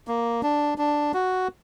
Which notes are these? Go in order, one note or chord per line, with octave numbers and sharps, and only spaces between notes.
A#3
D4
D4
F#4